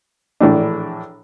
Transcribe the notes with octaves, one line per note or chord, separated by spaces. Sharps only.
A#1 A2 E3 A3 D4